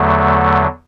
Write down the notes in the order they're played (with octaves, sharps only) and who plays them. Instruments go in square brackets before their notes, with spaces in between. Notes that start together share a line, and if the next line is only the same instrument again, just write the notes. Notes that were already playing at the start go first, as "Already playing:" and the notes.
Already playing: [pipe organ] E2 D3 F#3 A3